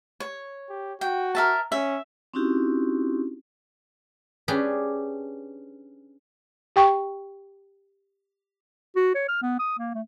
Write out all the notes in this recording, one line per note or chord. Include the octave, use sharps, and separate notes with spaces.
C#5
G4
F#4 G5
A#4 E5 A5
C#4 E5
C4 C#4 D#4 E4 F#4 G4
C#4 D4 G4 G#4 B4
G4 G5 C#6
F#4
C#5
F6
B3
D#6
A#3
A3